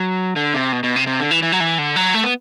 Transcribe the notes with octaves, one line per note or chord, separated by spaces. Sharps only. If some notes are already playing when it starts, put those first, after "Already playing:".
Already playing: F#3
D3
C3
B2
B2
C3
C3
D3
E3
E3
F#3
E3
D3
F#3
A3
B3